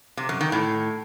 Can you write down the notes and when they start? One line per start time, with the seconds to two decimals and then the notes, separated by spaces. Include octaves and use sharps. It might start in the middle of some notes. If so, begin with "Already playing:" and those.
0.17 C3
0.29 F#2
0.41 D#3
0.52 A2